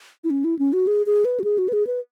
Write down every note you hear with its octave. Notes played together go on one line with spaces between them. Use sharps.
E4
C#4
E4
C#4
F#4
G#4
G#4
B4
F#4
G#4
F#4
B4
G#4
B4